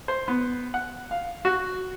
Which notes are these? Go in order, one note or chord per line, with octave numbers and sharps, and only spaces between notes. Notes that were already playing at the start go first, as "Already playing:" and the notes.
C5
B3
F#5
F5
F#4